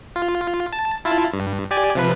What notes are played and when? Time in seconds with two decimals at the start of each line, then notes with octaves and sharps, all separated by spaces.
0.16 F4
0.72 A5
1.05 E4 F4 A5
1.33 G2
1.71 G4 D5 G#5
1.95 C3 F3 B4